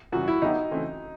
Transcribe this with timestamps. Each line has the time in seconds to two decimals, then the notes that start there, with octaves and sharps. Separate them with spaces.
0.12 F#2 C#3 E3 G3 F#4
0.28 E4
0.42 D3 F#3 B3 D#4 E4 G4
0.71 C#3 E3 A3 C4